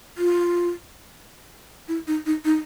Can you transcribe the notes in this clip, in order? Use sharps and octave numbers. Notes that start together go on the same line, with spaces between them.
F4
E4
D#4
D#4
D#4